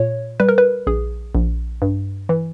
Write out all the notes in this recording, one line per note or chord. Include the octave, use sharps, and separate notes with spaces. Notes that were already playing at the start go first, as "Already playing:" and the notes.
Already playing: A#2 C#5
G3 B4
A#4
B4
A#1 G#4
A#1
G2
E3